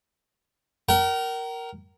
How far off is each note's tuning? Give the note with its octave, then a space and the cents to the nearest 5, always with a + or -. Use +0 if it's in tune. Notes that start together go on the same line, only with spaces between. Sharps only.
A#4 +0 G5 -45